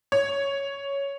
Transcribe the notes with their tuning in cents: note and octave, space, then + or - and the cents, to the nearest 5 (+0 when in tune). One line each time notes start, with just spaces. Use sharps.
C#5 +5